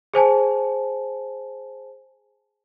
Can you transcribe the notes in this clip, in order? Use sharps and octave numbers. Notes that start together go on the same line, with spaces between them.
G#4 C5 G#5 A5